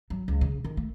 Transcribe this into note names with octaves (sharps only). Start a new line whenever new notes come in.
F#3
C#2
C#3
D#3
A3